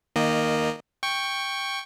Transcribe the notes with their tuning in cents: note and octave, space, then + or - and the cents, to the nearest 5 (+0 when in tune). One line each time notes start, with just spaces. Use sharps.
D#3 +0 A#3 +0 D#5 -20
G5 +10 C#6 +0